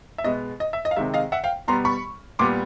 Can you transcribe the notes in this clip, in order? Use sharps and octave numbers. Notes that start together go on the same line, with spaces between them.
E5
B2 G#3 B3 D#5
D#5
E5
D#5
F5
C3 D#3 G#3 E5
D#5 F5
E5 F#5
F5 G5
B2 G3 B3 A#5 C6
B5 C#6
A#2 G3 B3 C6 D6